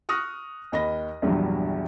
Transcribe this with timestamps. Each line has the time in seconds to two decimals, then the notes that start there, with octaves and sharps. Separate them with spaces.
0.09 C#6 D#6 F6 F#6 A#6
0.72 D#2 D#5 B5 A#6
1.22 A#1 E2 G2 F#3 G3